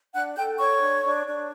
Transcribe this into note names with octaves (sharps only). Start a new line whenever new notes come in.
D4 F#5 F#6
A4 G5 G6
A4 C#5 C#6
D4
D4
D4